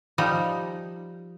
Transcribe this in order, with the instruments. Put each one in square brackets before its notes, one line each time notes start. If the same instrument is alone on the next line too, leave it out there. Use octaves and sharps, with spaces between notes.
[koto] F3 G3 D#4